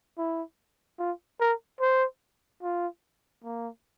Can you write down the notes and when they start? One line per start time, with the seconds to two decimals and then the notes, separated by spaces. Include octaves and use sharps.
0.18 E4
0.99 F4
1.41 A#4
1.81 C5
2.63 F4
3.44 A#3